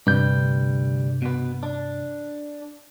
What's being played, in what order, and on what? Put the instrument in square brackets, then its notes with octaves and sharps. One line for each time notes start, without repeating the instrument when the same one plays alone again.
[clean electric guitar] D2 G3 [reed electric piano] G2 G6 [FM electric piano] C3
[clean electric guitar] B2 B3
D4